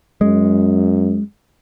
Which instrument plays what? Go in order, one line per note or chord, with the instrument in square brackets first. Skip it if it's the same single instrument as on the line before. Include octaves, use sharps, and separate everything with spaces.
[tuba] F#2 [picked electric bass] G#3